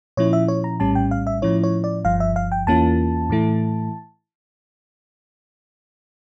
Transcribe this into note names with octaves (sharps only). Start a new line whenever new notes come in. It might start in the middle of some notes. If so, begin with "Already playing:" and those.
A#2 F3 C#4 E4 C#5
E5
C#5
A#5
A#1 A2 G3 C#4 A5
G5
F5
E5
A2 F3 C#4 E4 C#5
C#5
D5
G1 G2 F3 F5
E5
F5
G5
E2 E3 A#3 C#4 F4 A5
A2 E3 A3 E4